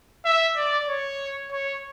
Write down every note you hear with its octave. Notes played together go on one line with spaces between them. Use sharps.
E5
D5
C#5
C#5